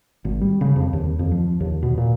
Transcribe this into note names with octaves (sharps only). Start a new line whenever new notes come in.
G#1
G3
C#3
F2
D#2
F2
F3
D#2
B2
A#2